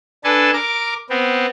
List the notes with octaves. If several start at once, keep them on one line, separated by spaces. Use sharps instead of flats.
D4 A4 B4 G#5 A5
A#4 D6
B3 C4